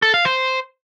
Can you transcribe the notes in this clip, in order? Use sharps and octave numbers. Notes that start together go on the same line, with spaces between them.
A4
F5
C5